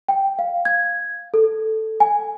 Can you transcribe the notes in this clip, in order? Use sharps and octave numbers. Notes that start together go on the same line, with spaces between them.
G5
F5
G#6
A4
G#5